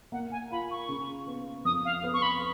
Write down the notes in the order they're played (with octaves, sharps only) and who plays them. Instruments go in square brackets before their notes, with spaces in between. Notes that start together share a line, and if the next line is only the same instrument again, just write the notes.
[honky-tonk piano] A#3 [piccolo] F#5
[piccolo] G#5
[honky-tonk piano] F4 [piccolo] B5
[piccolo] C#6
[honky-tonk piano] C#3
B3
[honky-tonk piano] F2 [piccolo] D#6
[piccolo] F5
[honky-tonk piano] B3
[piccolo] C#6
B5